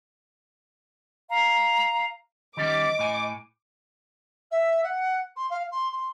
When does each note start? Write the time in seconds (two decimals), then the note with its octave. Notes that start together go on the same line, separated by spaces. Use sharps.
1.30 F5 A#5
2.57 D#3 G3 C#4 D#5 D6
2.99 A2 G#5
4.51 E5
4.83 F#5
5.36 C6
5.50 F5
5.71 C6
5.92 C6